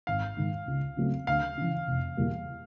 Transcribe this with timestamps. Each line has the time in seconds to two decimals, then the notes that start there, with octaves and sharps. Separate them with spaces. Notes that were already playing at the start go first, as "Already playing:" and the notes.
0.07 G#1 F5
0.37 G#2 D#3
0.67 C#2
0.97 C#3 F#3 A3 C4
1.27 D2 F5
1.58 C#3 E3
1.87 F1
2.17 E2 B2 G3 A#3